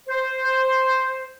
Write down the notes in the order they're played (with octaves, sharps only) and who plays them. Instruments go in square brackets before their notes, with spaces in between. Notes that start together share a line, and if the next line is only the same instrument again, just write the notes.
[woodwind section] C5